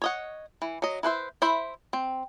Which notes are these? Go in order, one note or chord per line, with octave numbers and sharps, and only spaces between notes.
C#5 D#5 F#5
E3
F#3 D#5
E4 B4 C5 E5
E4 C5 E5 B5
C4